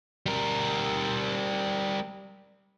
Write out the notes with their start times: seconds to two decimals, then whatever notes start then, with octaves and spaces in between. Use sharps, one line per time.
0.26 G3 A#4